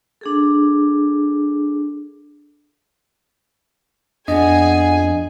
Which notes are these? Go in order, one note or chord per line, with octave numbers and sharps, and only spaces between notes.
D4 G#4 A4
F2 B3 D4 G#4 D#5 G#5